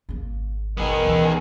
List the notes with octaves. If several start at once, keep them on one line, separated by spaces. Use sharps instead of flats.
G#1 C#3 A#3
E2 B2 D#3 B3 G#4
C#2 E3